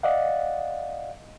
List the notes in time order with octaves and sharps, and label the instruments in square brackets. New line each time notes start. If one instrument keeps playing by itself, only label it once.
[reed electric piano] D5 D#5 F5 F#5